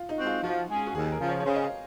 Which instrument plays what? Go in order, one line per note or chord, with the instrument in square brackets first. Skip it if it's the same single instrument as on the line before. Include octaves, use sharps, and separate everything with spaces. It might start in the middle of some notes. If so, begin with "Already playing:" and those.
Already playing: [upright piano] F4
D#4
[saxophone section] G#3 C4 F#4
[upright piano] F4
[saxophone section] F3 [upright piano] F#4
[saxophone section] G#3 C#4 G#4
[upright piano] F#4
[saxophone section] D#2 [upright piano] G#4
[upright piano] A#4
[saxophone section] C#3 F3
[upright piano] C#5
C#5
[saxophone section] C#3 [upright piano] C5
[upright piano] D#5
F5